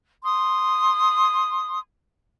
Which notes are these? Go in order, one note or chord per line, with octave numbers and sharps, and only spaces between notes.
C6 D#6